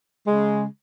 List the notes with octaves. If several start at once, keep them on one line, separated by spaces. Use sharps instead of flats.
C#3 G#3